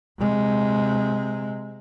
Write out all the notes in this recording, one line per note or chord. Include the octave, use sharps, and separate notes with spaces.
C3 G#3